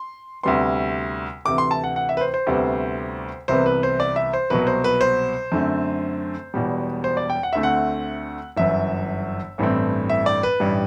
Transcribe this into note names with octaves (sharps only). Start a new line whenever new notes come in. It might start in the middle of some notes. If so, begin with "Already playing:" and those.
Already playing: C6
D2 C3 G3 B3 C6
D2 C3 E3 D6
C6
A5
F#5
F#5
E5
B4
C5
C5
D2 C3 G3 B3
C2 C3 E3 B3 C5
B4
C5
D5
E5
C5
C2 B2 F#3 B4
C5
B4
C5
F#2 D3 A3 C4
E1 E2 B2 G3
C5
D5
G5
F#5
D2 D3 A3 C4 E5
F#5
G1 F#2 E3 E5
A1 G2 E3 A3 C4
E5
D5
B4
A1 G2 E3 G3